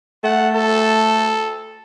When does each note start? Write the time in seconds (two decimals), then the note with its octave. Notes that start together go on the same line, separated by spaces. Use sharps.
0.24 A3 F#5
0.54 A4